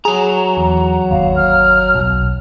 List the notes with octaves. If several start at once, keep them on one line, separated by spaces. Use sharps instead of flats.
F#3 G#4 A#5
E2
G1 D#2 F5
F6
B1